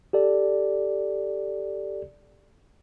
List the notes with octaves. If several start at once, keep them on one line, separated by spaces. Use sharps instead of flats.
G4 A4 D5